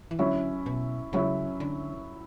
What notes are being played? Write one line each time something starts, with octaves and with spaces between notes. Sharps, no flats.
E3
D3 F#3 C#4 E4
B2
C#3 F#3 C#4 E4
D3